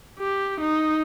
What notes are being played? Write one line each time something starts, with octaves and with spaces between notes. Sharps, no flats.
G4
D#4